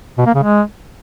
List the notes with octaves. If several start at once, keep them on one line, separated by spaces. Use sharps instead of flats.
B2
A#3
C#3
G#3